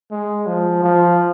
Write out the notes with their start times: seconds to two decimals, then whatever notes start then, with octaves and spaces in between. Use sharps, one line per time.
0.11 G#3
0.47 F3
0.83 F3